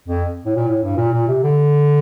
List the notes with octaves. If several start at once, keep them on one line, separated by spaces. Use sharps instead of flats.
F2
A2
A#2
A2
G2
A#2
A#2
C3
D3